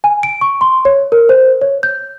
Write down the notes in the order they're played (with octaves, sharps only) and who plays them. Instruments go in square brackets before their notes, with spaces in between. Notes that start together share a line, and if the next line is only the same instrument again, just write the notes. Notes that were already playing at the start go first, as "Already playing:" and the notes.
[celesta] G#5
D7
C#6
C6
C#5
A#4
C5
C#5
G6